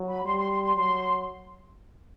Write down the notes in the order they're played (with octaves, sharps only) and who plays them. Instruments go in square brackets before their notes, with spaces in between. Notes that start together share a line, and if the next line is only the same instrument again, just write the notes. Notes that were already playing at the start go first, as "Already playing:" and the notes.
Already playing: [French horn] F#3
[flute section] B5
[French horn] G3 [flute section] C6
[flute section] C6
C6
C6
[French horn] F#3 [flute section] C6